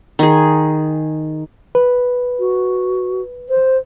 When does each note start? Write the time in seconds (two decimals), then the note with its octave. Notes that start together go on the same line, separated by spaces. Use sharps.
0.19 D#3 G#4
1.75 B4
2.39 F#4
3.49 C5